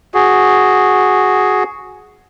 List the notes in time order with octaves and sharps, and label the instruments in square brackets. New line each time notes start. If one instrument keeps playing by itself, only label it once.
[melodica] F#4 G#4